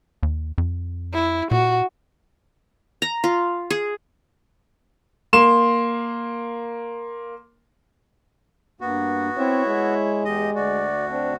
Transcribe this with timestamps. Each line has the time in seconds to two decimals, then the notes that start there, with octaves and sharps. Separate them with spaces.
0.23 D#2
0.58 F2
1.14 E4
1.51 A#2 F#4
3.02 A#5
3.24 F4
3.70 G#4
5.33 A#3 C6 E7
8.81 G2 A#3 B3 F#4
9.37 C4 E4 C#5 E5
9.67 G#3
10.25 E2 G4 D#5
10.55 D2 F#4 D5
11.09 C4 D4